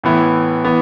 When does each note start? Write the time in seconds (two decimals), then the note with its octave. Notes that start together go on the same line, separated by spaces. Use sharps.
0.03 A2 E3 B3 E4
0.65 E3 B3